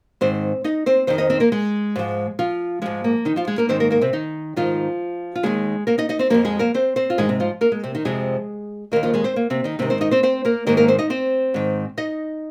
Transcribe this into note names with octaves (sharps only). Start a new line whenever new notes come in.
G#2 D#3 C4 C5
D#4 D#5
C4 C5
F2 D#3 C4 C5
D#4 D#5
C4 C5
A#3 A#4
G#3 G#4
G#2 F3
F3 F4
G#2 F3 G#3
A#3
D#3 D#4
F3 F4
G#3 G#4
A#3 A#4
G#2 D#3 C4 C5
A#3 A#4
A#3 A#4
C3 C4
D#3 D#4
G#2 D#3 F3 F4
F4
D#2 D#3 G#3 G#4
A#3 A#4
D#4 D#5
D#4 D#5
C4 C5
F2 C3 F3 A#3 A#4
G#3 G#4
A#3 A#4
C4 C5
C4 C5
F4
G#2 D#3 G#3 G#4
C3 C4
F3 F4
A#3 A#4
G#3
C3 C4
D#3 D#4
F2 C3 F3 G#3 G#4
D#2 D#3 A#3 A#4
F3 F4
G#3 G#4
C4 C5
A#3
C3 C4
D#3 D#4
G#2 C3 D#3 C4
C4 C5
D#4 D#5
C4 C5
C4 C5
A#3 A#4
G#2 D#3 A#3 A#4
A#3 A#4
C4 C5
D#4 D#5
C4 C5
G#2 D#3
D#4 D#5